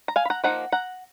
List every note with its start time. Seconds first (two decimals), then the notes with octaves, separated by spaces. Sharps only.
0.08 A#5
0.16 F5 G#5
0.25 B5
0.30 F#5 A#5
0.44 F3 A#3 D#4 F#5 A#5
0.72 F#5 A#5